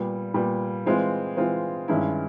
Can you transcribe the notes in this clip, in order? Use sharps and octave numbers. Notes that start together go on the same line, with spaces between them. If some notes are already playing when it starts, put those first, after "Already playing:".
Already playing: A#2 G3 B3
A#2 G3 B3
E3 G#3 C4 F4
E3 G#3 C4 F4
G2 D#3 G#3 C#4 E4